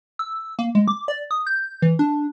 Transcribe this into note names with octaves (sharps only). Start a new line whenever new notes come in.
E6
A#3
G#3
D6
D5
D#6
G6
E3
D4